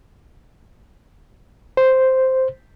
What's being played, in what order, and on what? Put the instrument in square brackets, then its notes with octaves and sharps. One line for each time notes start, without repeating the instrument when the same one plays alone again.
[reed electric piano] C5